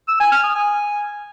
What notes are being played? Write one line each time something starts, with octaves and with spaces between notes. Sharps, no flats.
E6
G#5
F6
D#6
G#5